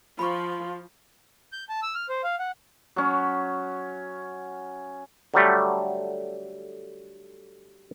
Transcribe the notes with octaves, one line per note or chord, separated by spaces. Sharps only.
F3 F4 B5 C#6
G6
A5
E6
F6
C5
F5
F#5
F#3 C#4
D3 F#3 G3 A3